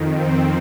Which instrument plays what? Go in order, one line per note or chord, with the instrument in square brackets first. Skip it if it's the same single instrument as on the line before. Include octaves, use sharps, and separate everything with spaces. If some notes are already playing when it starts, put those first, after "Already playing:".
Already playing: [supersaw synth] F2 D#3
C4